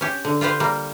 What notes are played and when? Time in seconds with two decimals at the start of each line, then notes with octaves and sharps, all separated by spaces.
0.01 C#4 G4
0.25 D3
0.41 F4 G4 B4 C5
0.60 G3 A#3